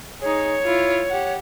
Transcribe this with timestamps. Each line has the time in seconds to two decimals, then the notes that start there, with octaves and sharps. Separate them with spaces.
0.21 D#4 G#4 C#5
0.66 E4 F4
1.10 G4 F#5